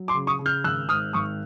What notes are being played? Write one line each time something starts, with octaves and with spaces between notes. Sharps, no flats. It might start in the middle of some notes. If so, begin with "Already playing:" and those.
Already playing: F#3
C6 D6
C#3
C#6 D#6
C#3
F6 G6
G#1 E6 F#6
G#2 D#6 F6
G#1 C#6 D#6